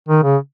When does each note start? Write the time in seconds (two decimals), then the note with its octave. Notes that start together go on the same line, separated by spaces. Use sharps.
0.09 D#3
0.23 C#3